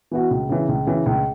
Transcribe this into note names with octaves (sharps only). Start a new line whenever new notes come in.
E3 B3 F#4
C#2
C#3 E3
C#2
C#3 E3
C#2